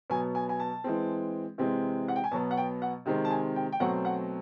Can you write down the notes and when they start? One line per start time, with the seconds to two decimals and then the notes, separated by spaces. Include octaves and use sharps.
0.10 B2 F#3 B3 G#5
0.35 G#5
0.49 G#5
0.60 A5
0.84 E3 G#3 C4
1.58 C3 E3 G#3 C4
2.08 F#5
2.16 G5
2.24 G#5
2.32 B2 F#3 B3 A5
2.51 F#5
2.57 G5
2.82 F#5
3.06 C3 D#3 G#3 C4
3.25 A5
3.31 G#5
3.56 G5
3.72 G5
3.80 B2 F#3 A3 C4 F#5
4.05 F#5